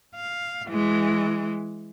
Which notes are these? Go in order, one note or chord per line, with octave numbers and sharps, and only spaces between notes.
F5
E3 G#3